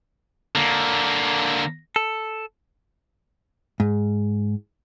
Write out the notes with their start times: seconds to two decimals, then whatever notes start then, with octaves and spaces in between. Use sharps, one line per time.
0.55 D3 A#3
1.96 A4
3.80 G#2